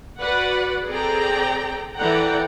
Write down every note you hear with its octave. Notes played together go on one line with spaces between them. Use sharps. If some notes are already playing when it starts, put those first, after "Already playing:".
F#4 B4 D5 F#5
C4 G#4 A4 D5 G5 A#5
E3 A4 D5 F#5 G5 A#5